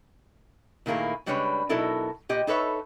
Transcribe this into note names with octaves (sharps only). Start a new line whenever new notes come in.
A#2 D#3 A3 A#3 E4 G#4
C#3 G3 G#3 D4 B4 C#5
B2 F#3 D#4 E4 A4 A#4
A#2 G4 D#5
D#4 A4 B4 C#5 E5